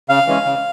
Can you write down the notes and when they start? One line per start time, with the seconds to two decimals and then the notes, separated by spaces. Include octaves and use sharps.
0.09 C#3 F5
0.27 E3 G#3 C#4
0.45 C#3